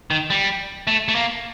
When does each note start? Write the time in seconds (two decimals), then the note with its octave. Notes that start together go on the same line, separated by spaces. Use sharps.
0.11 D#3
0.30 G3
0.87 A3
1.08 A3
1.15 A#3